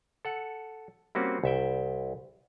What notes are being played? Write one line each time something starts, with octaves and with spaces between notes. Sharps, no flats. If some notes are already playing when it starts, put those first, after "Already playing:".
A4 F#5
G3 A#3 C4 C#4 F#4
C2 E5 G5